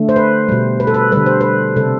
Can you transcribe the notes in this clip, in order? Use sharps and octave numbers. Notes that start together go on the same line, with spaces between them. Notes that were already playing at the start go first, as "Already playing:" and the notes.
Already playing: D3 A3
C5
B4
B2 G3
B4
A4
B4
D3 G3 B4
C5
B4
C3 G3 A4